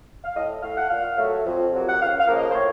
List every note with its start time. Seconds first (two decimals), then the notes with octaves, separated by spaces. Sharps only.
0.23 F5
0.36 A2 D#5
0.62 A3 F5
0.75 F#5
0.88 A#2 F5
1.17 F#3 A3
1.45 F2
1.73 C3 F#3 A#3
1.88 F#5
2.00 C#2 F5
2.18 F5
2.27 C#3 F3 A#3
2.36 D#5
2.50 C5
2.54 A2 C#5